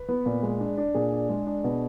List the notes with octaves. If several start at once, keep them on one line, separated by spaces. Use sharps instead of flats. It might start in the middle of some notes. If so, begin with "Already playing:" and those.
Already playing: B4
B3
A#2
G#3
D4
D4
A#2 G#4
D4
G#3
D4
B2